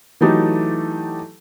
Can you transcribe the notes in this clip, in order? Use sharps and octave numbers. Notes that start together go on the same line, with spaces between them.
E3 F#3 A3 D#4 G4 A4